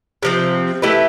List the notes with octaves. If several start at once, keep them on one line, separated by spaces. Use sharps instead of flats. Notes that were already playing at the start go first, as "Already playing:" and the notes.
C3 F3 C4
A3 E4 G4 B4